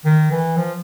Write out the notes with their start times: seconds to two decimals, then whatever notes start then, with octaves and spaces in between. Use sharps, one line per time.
0.05 D#3
0.32 E3
0.57 F3